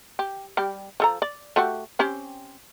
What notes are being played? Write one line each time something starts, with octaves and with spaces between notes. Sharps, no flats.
G4
G3 G4
F3 A4 A#5
D5
A3 F#4 G4
C4 C#4 G4